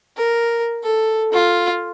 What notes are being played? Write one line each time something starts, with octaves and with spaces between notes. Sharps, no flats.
A#4
A4
F4